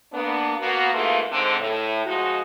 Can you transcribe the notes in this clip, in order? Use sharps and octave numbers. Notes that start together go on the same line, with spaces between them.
A#3 B3 D4
A#3 B3 F#4
G#2 C#3 E3 A3 A#3 F4
G#2 D3 C4
A2
F3 G#3 D#4 F#4